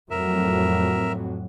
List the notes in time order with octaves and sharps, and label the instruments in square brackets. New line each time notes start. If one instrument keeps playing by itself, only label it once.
[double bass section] F2 A2 F#3 [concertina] A#4 E5